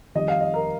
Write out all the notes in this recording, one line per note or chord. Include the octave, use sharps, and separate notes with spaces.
F2 D#3 G3 D#5
F5
D#5
A#4